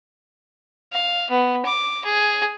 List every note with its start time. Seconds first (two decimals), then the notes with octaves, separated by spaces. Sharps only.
0.92 F5
1.30 B3
1.65 D6
2.05 G#4